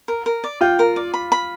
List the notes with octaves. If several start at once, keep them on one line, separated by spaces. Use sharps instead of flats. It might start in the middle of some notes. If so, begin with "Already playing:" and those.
A#4
A#4
D5
F4 G5
A#4
D5
B5
B5